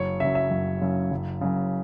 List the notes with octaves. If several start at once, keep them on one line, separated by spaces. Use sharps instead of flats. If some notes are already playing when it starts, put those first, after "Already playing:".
Already playing: F#1 C#5
F#2 C#3 E5
E5
F#1
F#2 C#3
F#1
F#2 C#3